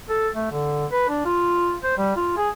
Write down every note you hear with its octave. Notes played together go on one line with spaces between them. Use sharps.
A4
A3
D3
B4
D4
F4
C5
G3
F4
G#4